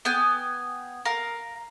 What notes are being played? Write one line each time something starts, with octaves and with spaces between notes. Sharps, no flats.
B3 G5 G#5
A#4 F5